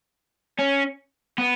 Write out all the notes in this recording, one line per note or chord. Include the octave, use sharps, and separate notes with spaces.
C#4
B3